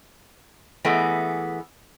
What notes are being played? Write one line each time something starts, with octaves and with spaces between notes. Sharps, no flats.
E3 G#3 A3 B3